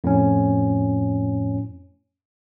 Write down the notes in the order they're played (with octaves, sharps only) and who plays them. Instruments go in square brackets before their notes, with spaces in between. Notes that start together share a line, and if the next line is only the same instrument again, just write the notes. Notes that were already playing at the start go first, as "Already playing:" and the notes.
[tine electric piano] F2 A2 C#4